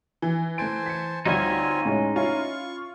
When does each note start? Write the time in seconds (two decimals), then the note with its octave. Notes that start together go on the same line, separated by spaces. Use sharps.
0.22 E3
0.58 A3 C5 G#5 A5 D7
0.86 B6 C#7
1.25 D2 G3 C4 D#4 F4 C#5 D#5 G#5
1.85 A2 G#3 C#4
2.16 C#4 E4 F4 C#6